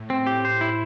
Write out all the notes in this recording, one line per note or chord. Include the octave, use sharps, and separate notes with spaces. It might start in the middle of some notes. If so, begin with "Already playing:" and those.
Already playing: A2
C4
G4
C5
E4